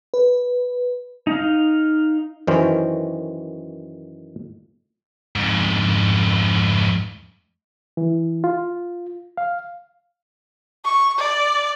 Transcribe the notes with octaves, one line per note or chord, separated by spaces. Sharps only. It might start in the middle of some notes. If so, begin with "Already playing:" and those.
B4
D#4 F5
F#2 D#3 E3 C#4 C5
F2 G#2
E3
F4
F5
C#6
D5